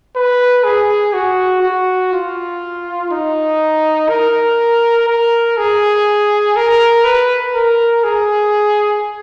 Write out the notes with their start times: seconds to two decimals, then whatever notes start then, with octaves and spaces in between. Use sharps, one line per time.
0.16 B4
0.64 G#4
1.14 F#4
1.62 F#4
2.13 F4
3.11 D#4
4.09 A#4
5.08 A#4
5.57 G#4
6.56 A#4
7.04 B4
7.54 A#4
8.04 G#4